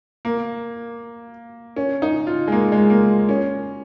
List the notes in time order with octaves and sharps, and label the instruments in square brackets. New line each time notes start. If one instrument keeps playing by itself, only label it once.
[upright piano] A#3
C#4
D#4
F4
G#3
A#3
G#3
A#3
C#4